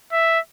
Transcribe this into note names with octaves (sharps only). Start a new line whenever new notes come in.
E5